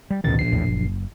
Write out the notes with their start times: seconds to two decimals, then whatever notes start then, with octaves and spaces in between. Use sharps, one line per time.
0.11 G3
0.24 A1 D2 B2 D#3 A6
0.39 A#1 C7
0.52 B1 E2 A2
0.68 F#1